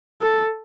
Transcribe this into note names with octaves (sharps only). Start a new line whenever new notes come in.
A4